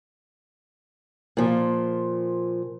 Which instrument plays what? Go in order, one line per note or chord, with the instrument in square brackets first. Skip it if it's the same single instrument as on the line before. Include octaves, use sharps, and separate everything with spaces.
[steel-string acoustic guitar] A#2 F3